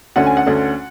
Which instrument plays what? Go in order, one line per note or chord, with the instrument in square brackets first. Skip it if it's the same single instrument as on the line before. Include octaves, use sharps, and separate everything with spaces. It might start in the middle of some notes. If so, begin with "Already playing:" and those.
[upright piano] D2 D3 A3 C#4 F#5
G#5
F#5
D2 D3 A3 C#4